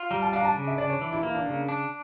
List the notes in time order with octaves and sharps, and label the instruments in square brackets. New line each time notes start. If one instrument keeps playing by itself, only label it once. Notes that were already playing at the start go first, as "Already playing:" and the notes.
Already playing: [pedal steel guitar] F4
[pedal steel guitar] G3 [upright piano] A#5
[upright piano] A5
[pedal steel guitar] D4 [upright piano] F5
[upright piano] A#5
A5
[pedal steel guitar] C#3
[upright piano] E5
[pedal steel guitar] D4 [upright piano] D5
[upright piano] C#5
[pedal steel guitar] E3
[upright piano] E4
[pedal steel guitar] A#3 [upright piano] E4
[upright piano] D4
[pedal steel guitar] C#3 [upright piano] D4
[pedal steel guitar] D4